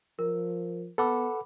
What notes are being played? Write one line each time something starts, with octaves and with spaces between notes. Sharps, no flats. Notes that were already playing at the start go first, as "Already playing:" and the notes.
F3 A#4
B3 A4 B4 F#5 B5 D6